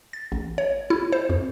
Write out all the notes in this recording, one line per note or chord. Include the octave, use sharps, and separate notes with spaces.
A6
A1
C#5
E4
C5
F2